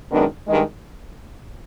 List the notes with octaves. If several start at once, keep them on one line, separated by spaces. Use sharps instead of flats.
F#2 D#3 G#3 B3 D4
G2 D#3 G#3